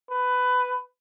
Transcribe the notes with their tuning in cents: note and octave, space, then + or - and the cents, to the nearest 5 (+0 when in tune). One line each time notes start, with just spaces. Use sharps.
B4 +15